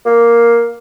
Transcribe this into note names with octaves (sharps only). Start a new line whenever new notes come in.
A#3